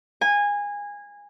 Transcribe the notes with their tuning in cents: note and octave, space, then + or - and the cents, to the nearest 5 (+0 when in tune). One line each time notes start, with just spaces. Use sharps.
G#5 -20